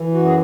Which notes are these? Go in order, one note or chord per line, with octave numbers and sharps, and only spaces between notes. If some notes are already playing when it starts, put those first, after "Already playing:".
Already playing: E3
F#2 F#4
G#4